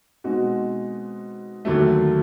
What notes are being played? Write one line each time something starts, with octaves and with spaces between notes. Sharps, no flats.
B2 G#3 C4 D#4 F#4
D#2 D3 F#3 A3